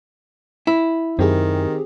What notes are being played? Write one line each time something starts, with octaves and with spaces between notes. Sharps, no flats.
E4
F#2 D#3 C4 G4 G#4